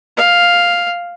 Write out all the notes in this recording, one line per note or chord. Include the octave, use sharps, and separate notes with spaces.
F5